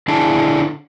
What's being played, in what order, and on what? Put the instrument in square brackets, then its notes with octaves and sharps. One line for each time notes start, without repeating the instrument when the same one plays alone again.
[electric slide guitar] D3 D4 E4 G#4 D5 A5